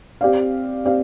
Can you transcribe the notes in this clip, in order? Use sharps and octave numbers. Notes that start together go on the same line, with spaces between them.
C4 G4 D5 F5
C4 G4 D5 F5